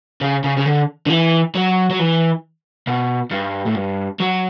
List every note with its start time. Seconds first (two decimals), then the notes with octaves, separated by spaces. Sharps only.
0.21 C#3
0.44 C#3
0.57 C#3
0.66 D3
1.06 D3
1.10 E3
1.55 F#3
1.90 F#3
1.99 E3
2.87 B2
3.31 G2
3.67 A2
3.76 G2
4.20 F#3